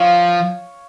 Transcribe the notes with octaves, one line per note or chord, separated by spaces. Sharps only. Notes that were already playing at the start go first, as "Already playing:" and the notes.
Already playing: F3 C#5 F5